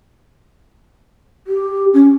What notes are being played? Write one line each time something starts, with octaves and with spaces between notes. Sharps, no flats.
G4
C#4